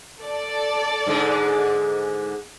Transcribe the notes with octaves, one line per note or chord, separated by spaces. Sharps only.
A4 D5
G#2 D3 G#3